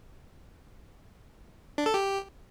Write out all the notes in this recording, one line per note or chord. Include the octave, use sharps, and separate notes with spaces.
D4
A4
G4